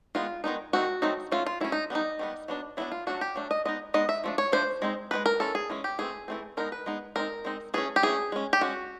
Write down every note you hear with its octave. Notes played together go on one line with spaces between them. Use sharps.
D#3 G#3 B3 D#4 F4
D#3 G#3 B3 D#4
D#3 F#3 A3 C4 D#4 F#4
D#3 F#3 A3 C4 D#4
F#3 A3 C#4 F4
F4
F#3 A3 C#4 E4
D#4
D#3 G3 B3 D#4
D#3 G3 B3
F#3 B3 D4
F#3 B3 D4 E4
F4
F#3 A3 D4 F#4
G4
F#3 A3 D4
D#5
G#3 B3 D#4 D#5
G#3 B3 D#4 D#5
E5
F3 A3 D4
C#5
F3 A3 D4 C5
G#3 C4 D#4
G#3 C4 D#4 B4
A#4
E3 G#3 C#4 A4
G#4
E3 G#3 C#4
G4
E3 A3 C4 G#4
E3 A3 C4
G#3 B3 D#4 A#4
B4
G#3 B3 D#4
G#3 C4 D#4 A#4
G#3 C4 D#4
E3 A3 C#4 G#4
G4
E3 A3 C#4 G#4
G#3 C#4
G4
G#3 C#4 F#4